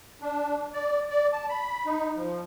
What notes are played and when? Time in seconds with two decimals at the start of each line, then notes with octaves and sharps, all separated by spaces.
0.21 D4
0.73 D5
1.10 D5
1.32 A5
1.49 B5
1.86 D#4
2.16 F3